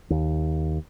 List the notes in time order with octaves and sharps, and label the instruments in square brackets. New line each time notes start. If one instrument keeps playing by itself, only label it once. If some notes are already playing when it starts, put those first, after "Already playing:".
[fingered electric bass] D#2